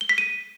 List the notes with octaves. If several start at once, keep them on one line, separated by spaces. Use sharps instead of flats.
G7
B6
D#7